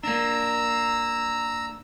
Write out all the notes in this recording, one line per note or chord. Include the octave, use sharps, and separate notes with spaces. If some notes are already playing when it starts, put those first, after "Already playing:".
A#3 D4 A#5 E6